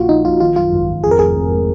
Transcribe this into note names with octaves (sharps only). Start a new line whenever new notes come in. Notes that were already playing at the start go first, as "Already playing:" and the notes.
Already playing: A#1 A#2 F4 F#4
F3 D#4
A#1 F4
D#3 F4
F#2 F4
G#1
G#1
F2 G#4
A#4
F1 G#4
F2
G#3